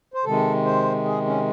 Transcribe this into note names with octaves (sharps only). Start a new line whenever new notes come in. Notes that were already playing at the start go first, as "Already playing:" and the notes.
C5
C3 D#3 G#3 A4
C5
G#4
C#4